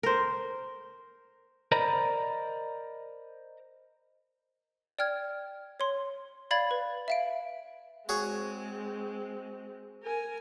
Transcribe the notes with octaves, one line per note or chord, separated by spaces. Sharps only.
A#4 C5
A#4 C5 D5 D#5 A#5 B5
D5 G5 F6 G#6
C#5 C6
D5 F5 B5 G#6 A6
B4
E5 F5 D7
G#3 C4 F#4 G#4 C#5
A#4 G#5